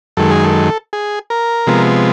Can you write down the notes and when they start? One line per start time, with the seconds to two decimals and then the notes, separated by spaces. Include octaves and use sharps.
0.17 F#2 D#3 G#3 A4
0.31 G#4
0.44 A4
0.93 G#4
1.30 A#4
1.67 C3 F3 G#3 B3